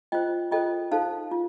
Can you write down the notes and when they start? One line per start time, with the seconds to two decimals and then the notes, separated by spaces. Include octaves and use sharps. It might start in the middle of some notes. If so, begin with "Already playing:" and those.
0.12 F4 C5 D#5 G5
0.51 F4 A4 C5 D#5 G5
0.91 D#4 A4 C5 F5 A5
1.31 F4